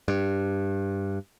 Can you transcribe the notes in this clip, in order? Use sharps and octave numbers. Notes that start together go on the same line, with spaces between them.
G2